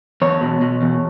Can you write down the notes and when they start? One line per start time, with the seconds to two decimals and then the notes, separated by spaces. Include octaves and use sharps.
0.22 E2 C#5
0.41 B2
0.62 B2
0.82 E2